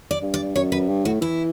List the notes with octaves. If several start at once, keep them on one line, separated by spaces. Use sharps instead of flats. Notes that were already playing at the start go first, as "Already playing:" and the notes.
D5
G2
D5
F#2 C#5
F#2 B4
G2
A2 F#4
E3 E4